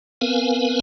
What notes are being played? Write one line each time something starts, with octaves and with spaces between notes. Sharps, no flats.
B3 C4 A#4 B4 F5 G#5